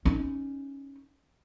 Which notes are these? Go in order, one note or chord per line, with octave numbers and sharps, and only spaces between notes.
C#4 D#4